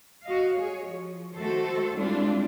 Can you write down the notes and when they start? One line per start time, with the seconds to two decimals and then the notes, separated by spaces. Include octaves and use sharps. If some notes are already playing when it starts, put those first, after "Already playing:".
0.24 F#4 D#5 F5
0.56 G#4 C#5
0.88 F3
1.36 D#3 A3 F#4 A4 C5
1.98 G3 G#3 C4 D4 E4 F4